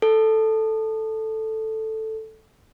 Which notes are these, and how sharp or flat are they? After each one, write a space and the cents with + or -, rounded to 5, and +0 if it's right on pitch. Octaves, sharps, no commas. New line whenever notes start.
A4 +0